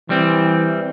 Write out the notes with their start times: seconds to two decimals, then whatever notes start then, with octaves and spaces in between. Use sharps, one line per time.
0.10 E3 G3 C4